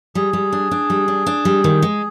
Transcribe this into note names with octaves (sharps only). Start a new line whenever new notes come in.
G3 G#4
G3
D4
D4
G3
D4
D4
G3
D#3
G#3